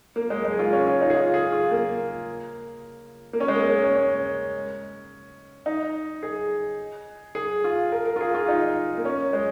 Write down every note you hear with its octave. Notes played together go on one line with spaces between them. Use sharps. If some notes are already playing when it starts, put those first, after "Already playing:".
A#3
G#3
G#3
G#4
F4
C#4
F4
D#4
G#4
F4
G#4
F4
A#3
A#3
C#4
G#3
A#3
A#3
C#4
C#4
D#4
G#4
G#4
F4
A#4
A#4
F4
G#4
F4
D#4
A#3
C#4
G#3